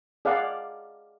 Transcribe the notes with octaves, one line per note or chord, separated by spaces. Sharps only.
G#4 D5 F5 F#5